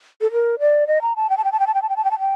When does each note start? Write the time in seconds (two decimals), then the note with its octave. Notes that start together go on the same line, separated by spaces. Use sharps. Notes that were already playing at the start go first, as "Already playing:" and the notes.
0.21 A4
0.32 A#4
0.60 D5
0.87 D#5
1.02 A#5
1.16 A5
1.30 G5
1.37 A5
1.44 G5
1.52 A5
1.59 G5
1.67 A5
1.74 G5
1.82 A5
1.89 G5
1.96 A5
2.05 G5
2.11 A5
2.19 G5